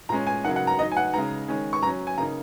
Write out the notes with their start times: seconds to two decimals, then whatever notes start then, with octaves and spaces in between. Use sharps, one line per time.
0.09 A#2 G#3 C#4 A#5
0.27 G#5
0.44 C#3 F#3 A#3 D#4 F#5
0.56 F#5
0.67 A#5
0.79 F#3 D#4 D#5
0.92 G#5
0.97 F#5
1.13 C#3 G#3 D#4 A#5
1.48 D#3 G#3 C#4
1.73 C#6
1.83 F#3 C#4 A#5
2.07 G#5
2.17 C#3 A#3 D#4 A#5